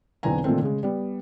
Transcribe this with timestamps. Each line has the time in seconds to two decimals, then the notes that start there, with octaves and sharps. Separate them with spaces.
0.23 B1 E2 D3 C4 G#5 A#5
0.44 A#2 D3 D#3 A3 C4
0.63 C#3 G#3
0.83 G3 B3